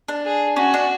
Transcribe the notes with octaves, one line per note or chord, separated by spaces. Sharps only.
D4
G#4
C#4 F#4
D4